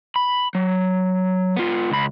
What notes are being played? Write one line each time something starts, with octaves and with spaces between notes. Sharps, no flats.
B5
F#3
B3 F4
C#2 B5